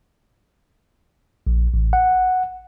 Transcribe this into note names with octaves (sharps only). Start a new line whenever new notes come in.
A#1
A1
F#5